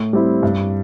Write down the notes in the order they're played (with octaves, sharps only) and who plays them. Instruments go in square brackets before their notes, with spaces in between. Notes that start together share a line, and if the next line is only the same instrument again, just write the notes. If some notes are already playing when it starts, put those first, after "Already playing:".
Already playing: [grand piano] A2
G3 C4 E4
G2